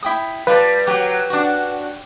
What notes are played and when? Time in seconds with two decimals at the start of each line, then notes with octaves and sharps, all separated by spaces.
0.03 E4 G5 D#6
0.47 G3 F4 B4 A5
0.87 F#3 G4 F#5
1.30 D4 F#4